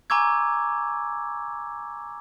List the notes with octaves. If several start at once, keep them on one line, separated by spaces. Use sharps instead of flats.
G#5 A#5 C#6 D6 E6 G#6